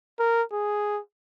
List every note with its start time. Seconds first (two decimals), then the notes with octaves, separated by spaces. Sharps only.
0.19 A#4
0.52 G#4